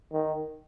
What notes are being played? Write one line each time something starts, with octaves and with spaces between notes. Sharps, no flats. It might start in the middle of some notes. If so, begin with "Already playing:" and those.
D#3